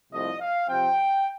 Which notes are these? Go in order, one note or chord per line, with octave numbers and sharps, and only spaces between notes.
C2 C3 F3 A3 D#5
F5
C3 F3 C4 G5